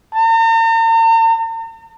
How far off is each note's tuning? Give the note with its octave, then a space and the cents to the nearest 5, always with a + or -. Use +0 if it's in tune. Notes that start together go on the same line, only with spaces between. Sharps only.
A#5 -45